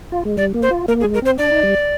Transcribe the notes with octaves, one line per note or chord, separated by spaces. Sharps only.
F4
G#3
G3 D5
A#3
C5
F4
A#3 A#4
G#4
G#3
A#4
C4 C5
D4 D5
D#4
G3